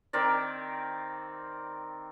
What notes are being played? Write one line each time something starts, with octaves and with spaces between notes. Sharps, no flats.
D#3 C4 A#4 D5